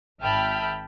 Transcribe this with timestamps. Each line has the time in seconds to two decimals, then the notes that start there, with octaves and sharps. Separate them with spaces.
0.22 G#1 E5 G5 A5 B5 F6